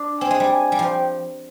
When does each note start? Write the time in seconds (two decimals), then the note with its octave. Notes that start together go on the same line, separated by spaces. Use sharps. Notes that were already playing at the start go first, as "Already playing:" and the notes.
Already playing: D4
0.21 C4 G#5
0.31 G#3
0.40 G3
0.51 G#5
0.72 G3
0.79 F3 G5